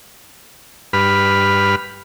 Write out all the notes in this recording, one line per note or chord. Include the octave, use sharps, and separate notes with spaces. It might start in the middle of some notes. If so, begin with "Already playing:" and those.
G2 B4 B5 F6